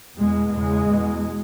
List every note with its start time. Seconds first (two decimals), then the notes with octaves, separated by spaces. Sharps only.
0.17 E2 B2 G#3
0.52 E2 C#3 G#3
0.87 E2 B2